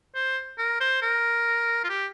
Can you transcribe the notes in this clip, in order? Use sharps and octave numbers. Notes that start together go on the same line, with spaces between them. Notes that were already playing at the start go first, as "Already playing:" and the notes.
C5
A#4
C5
A#4
F4
G4